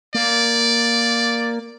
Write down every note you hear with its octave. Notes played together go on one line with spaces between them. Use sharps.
A#3 D5